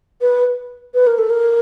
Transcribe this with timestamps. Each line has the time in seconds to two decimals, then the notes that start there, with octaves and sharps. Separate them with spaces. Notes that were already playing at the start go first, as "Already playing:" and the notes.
0.21 B4
0.94 B4
1.06 A#4
1.18 A4
1.30 A#4